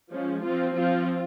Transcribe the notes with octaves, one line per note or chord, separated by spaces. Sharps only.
F3 G#3 C#4
F3 C4 F4
F3 C4 F4